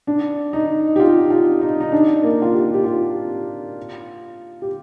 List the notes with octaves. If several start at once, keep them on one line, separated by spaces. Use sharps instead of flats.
D4
D#4
G4
F4
F4
D#4
D#4
D4
A#3
F4
G4
G4
F4
G4